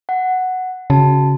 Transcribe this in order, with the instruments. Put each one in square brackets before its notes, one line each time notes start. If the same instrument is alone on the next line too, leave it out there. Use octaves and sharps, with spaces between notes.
[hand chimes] F#5
[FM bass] C#3 [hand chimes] F#4 A5